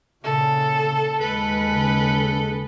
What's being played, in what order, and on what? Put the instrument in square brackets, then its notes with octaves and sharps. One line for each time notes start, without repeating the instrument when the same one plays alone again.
[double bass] A#2 C#3 [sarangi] A4
[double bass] D#2 G#3 [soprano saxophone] A4 [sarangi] B4
[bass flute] C#3